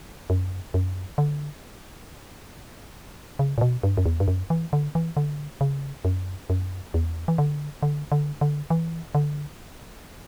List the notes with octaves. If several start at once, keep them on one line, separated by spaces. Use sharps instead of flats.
F#2
F#2
D3
C#3
A#2
B2
G2
F#2
E2
G2
F#2
E3
D3
E3
D3
C#3
F#2
F#2
E2
E3
D3
D3
D3
D3
E3
D3